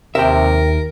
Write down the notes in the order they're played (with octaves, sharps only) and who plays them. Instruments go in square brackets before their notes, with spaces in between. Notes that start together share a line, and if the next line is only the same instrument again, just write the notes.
[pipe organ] D#2 [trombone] C3 [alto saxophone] A#4 [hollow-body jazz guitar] E5 G5